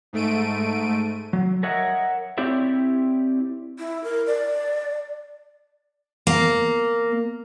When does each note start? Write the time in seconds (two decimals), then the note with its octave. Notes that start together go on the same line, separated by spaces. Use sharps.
0.13 G#2 A3 D7 D#7
1.33 F#3
1.63 A#4 C#5 D#5 E5 F#5
2.38 C4 E4 G4 C#5 D5 E5
3.78 E4
4.04 A#4
4.27 D5
6.27 A#3